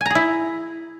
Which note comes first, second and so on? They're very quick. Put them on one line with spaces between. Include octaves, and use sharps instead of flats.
G#5 A#5 G#4 E4